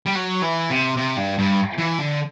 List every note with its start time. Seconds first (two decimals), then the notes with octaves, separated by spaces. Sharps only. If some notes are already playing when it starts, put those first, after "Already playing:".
0.06 G3
0.15 F#3
0.42 E3
0.70 C3
0.97 C3
1.17 G2
1.38 G2
1.78 E3
1.99 D3